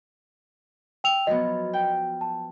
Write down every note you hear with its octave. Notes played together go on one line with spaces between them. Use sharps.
G5 E6 F7
F3 F#3 B3 D#5
G5
A5